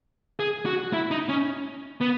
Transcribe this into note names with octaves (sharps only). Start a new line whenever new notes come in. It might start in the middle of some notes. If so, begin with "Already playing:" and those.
G#4
F#4
E4
D#4
C#4
B3